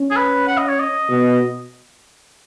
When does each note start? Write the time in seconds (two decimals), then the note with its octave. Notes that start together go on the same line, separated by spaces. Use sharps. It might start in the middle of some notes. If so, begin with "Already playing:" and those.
Already playing: C#4
0.11 G#4
0.16 B4
0.47 F#5
0.57 D#5
0.68 C#5
0.79 D#5
1.10 B2